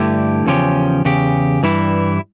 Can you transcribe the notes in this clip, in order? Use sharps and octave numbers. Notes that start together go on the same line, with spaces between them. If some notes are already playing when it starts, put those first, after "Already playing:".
Already playing: G2 D3 A3 E4 G4
E2 C#3 F3 C#4 G4
E2 C#3 G4
G2 E3 G3 E4